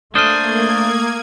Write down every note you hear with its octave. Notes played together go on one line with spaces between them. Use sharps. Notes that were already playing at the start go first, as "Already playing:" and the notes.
A3 A#3 D4 C5 D#6 F6 G#6 D#7